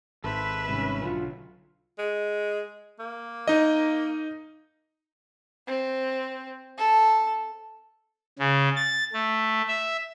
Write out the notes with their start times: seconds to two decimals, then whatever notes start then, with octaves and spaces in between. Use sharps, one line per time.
0.24 G#1 A4 B4 C5 E5
0.69 C2 G#2 C3 C#4
1.03 B1 D3 F#3 F4
1.99 G#3
2.99 A#3
3.48 D#4 D#5
5.67 C4
6.78 A4
8.39 C#3
8.76 A6
9.13 A3
9.68 E5